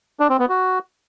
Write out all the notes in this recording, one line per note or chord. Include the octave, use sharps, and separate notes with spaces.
D4
C4
B3
F#4